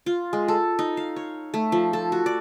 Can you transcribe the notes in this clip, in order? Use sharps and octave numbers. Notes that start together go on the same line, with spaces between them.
F4
G#3
A4
D#4
F5
C#5
A3
F3
A4
F#4
D5